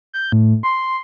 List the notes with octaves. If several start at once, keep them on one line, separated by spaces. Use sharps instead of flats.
G6
A2
C6